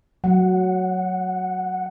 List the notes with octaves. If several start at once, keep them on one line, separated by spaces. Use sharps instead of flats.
F#3 A3 F#5